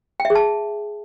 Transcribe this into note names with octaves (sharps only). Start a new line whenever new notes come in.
G5
E5
G#4
A5